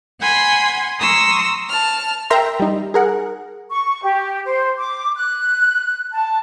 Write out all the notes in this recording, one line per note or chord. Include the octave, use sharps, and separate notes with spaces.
F#5 G#5 B5 C6
A#5 C6 C#6 D#6 E6
A5 F6
A#4 E5 G5 A#5 C6
G3 D#4
G#4 A#4 F#5
C#6
G4
C5
D6
F#6
A5